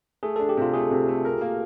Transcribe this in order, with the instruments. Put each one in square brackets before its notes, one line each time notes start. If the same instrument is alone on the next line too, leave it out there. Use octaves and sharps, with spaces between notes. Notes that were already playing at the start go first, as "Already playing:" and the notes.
[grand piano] A3 [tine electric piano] G#4
[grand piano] D4 [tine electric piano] A4
[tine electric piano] G4
[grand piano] C3 [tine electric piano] F4
[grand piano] A3 [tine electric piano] G#4
[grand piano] C3
A3
A#4
A#3